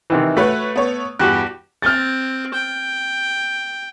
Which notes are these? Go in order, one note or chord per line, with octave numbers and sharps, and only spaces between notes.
C3 D#3 E3
A3 F#4 B4 C#5
B3 C#5
E2 G2 F#4 G4 F#6
C4 F6 A6
G5